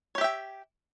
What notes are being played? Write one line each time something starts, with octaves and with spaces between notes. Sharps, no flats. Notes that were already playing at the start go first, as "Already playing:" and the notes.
G4 C#5 E5 G5